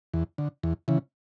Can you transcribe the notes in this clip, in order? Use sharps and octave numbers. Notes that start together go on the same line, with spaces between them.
E2
D3
E2
C#3 E3